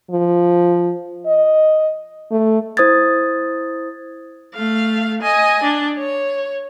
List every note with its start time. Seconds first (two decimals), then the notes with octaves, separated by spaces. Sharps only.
0.10 F3
1.26 D#5
2.31 A3
2.77 E4 C5 D#6 G#6 A6
4.55 A3 F5
5.22 D#5 G#5
5.63 D4
5.99 C#5